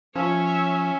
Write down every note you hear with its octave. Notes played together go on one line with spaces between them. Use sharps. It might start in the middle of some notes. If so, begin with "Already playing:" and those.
F3 C#4 C#5 E5